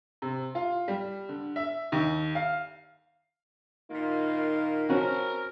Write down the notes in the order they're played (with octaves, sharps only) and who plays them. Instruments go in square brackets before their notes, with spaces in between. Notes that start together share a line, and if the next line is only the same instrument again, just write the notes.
[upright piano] C3
F4
G3
D3
E5
D#2
F5
[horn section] A#2 D#3 A#3 [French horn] D#4 [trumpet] F4
[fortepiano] C4 C#4 F#4 [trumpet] A#4